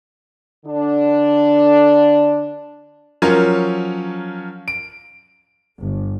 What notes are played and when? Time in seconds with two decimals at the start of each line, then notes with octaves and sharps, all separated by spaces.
0.65 D3 D4
3.22 F3 F#3 C#4 A#4 C#5
4.68 D7
5.78 G1